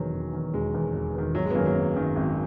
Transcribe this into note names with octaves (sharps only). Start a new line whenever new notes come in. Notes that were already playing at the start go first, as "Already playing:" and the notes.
Already playing: E1 E2 D#3 F#3
E1
E2 D#3
E1 G#3
E2 D#3
E1
E2 D#3
G#1 F#3
G#3
B3
F#2 D#3 F#3 A#3
F#3 A#3
G#1
F#2 D#3
G#1